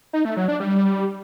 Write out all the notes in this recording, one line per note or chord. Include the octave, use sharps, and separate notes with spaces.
D#4
A3
F#3
D4
G3